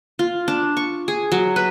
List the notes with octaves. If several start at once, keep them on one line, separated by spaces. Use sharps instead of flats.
F4
D4
C#6
G#4
F#3
B4